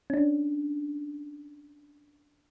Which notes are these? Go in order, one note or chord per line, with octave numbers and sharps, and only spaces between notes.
C#4 D4